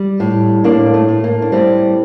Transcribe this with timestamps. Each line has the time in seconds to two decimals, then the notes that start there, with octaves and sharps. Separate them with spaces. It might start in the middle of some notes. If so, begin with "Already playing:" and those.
Already playing: G3
0.20 A2
0.64 A2 A#3 D4
0.94 A3
1.09 A2
1.24 A#3
1.42 D4
1.52 G3 A3 C4